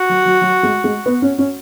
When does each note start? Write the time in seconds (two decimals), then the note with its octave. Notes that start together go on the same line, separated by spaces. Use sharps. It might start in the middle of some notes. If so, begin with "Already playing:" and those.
Already playing: F#4
0.09 F#3
0.25 F#3
0.41 F#3
0.63 G#3
0.84 G#3
1.06 B3
1.22 C#4
1.39 C#4